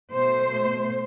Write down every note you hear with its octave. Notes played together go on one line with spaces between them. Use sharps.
B2 A3 C5